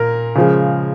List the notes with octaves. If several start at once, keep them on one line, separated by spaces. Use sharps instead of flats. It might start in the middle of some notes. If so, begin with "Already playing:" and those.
Already playing: A#2 A#4
C#3 F3 G#3